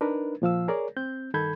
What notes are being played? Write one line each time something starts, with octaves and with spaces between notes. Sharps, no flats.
D4 D#4 A#4 B4
A#2 F3 F5 E6
G#4 A#4 C#5 D5
C4 G6
G2 D#3 A4 B5 G6 G#6